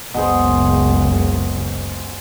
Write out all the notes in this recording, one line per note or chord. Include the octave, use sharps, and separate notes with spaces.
F#1 C#2 B2 G#4 C5